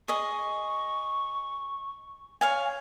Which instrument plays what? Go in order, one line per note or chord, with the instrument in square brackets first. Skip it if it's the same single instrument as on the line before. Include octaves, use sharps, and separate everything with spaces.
[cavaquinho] G#4 D#5 [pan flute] C#6
[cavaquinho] C#5 F5 G#5